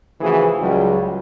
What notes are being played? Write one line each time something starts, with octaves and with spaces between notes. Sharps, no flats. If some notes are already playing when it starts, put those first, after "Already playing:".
C#3 E3 F3 A3 F#4 G#4
C#2 F#3 G3